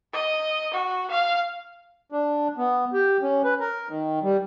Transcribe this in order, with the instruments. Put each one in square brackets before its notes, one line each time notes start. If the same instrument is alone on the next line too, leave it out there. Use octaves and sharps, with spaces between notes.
[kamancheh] D#5
F#4
F5
[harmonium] D4
B3
G4
C#4
B4
A#4
D#3
G3